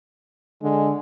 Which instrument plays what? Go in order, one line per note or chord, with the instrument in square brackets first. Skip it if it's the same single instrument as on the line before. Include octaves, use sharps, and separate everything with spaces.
[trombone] D3 [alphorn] G#3